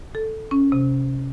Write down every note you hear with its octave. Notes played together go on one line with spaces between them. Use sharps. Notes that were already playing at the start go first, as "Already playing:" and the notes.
A4
C#4
C3